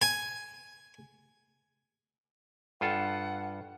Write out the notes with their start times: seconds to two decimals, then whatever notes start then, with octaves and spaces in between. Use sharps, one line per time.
0.02 G#5
2.81 G2 F4 A4 F#5